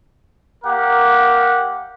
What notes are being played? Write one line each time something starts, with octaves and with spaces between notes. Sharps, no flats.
A#3 G4 A#4 F#5